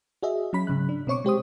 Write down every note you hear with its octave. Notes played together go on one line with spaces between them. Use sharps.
F#4 G#4 D#5 E5
F#3 C#4 B5 B6
G#2 C#3 F#3 F#6
D4
B2 C4 C#5 C#6 D6
G#3 G4 C5 D#6